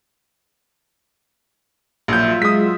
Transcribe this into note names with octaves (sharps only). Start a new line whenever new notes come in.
A#1 F#3 F4 E5 G6
G#3 D#6 B6